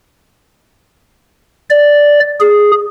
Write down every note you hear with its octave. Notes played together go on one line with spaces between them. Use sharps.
D5
G#4